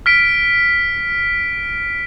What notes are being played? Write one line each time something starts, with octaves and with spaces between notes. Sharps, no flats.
F6 B6 D7